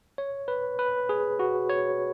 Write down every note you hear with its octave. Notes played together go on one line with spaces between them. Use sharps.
C#5
B4
B4
G#4
F#4
C#5